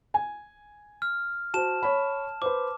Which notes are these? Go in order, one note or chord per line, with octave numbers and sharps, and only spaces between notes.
G#5
F6
F#4 C5 A5 E7
C#5 B5
B4 C5 D6